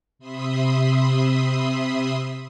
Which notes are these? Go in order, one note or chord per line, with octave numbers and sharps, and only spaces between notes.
C3 E5 B5 C6 D#6